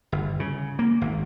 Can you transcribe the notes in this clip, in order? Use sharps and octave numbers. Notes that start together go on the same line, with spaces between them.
G1
C#3
A#3
G#1